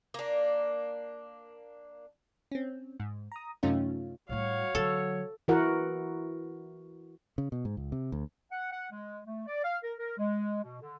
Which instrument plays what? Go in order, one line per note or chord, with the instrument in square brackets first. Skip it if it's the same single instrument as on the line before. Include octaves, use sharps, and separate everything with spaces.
[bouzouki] A#3 D4
[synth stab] C4 C#4
G#2
A#5 D#6
F#2 C3 A3 C#4 D#4 F4
[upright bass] A2 G3 [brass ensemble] F#4 C#5 [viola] F5 C#6
[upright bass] D3 F#3 [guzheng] A4
[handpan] E3 E4 F#4 A#4 F#5
[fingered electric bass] C#3
B2
G#2
C#2
C3
D2
[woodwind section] F#5
F#5
G#3
A3
D5
F5
A#4
A#4
G#3
B2
D3